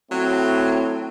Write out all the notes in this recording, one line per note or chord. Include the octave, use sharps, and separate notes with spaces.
A2 F#3 C4